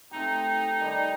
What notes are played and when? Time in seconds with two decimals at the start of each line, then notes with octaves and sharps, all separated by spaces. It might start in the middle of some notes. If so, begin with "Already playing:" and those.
0.11 A3 C4 D#4 G4
0.81 D#3 G3 D4 G4